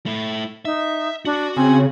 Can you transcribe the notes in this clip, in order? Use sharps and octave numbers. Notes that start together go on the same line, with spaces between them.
A3 E4
D#4 E5
D4 F#4
C#3 C4 G#5